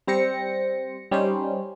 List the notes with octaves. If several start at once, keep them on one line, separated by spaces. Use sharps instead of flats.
G3 C4 C5 A#6 C#7
G3 C#4 D#4 C5